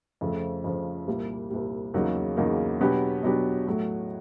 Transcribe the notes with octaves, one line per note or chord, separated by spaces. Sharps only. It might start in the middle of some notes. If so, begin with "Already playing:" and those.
F2 C#3 F3 A3
F2 C#3 F3 A3
C2 A#2 G3
C2 A#2 G3
E2 C#3 F#3 A#3 D#4
E2 C#3 F#3 A#3 D#4
B2 F#3 B3 D4 G4
B2 F#3 B3 D4 G4
A2 F#3 A3